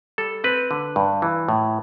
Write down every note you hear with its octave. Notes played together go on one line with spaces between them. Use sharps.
G3 A4
C4 B4
D3
G2
E3
A2